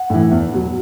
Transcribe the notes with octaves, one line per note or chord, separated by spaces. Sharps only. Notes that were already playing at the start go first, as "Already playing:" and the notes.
Already playing: F#5
A2 E3
E2
B2 F#3